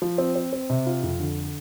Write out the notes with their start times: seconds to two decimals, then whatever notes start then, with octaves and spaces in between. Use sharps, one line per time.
0.02 F3
0.18 C4
0.35 C4
0.53 C4
0.70 C3
0.87 F4
1.03 F2
1.20 D3